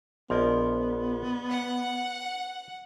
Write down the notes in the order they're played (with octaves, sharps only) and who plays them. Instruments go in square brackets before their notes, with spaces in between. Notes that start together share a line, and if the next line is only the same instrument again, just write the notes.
[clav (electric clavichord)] A#1 F3 A#4 [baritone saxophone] B3 [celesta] D5 D#5 C6
[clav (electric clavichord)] B4 [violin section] F#5